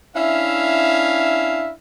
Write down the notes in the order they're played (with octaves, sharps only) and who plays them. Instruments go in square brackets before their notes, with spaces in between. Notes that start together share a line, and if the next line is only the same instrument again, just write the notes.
[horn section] C#4 D4 E4 E5 F5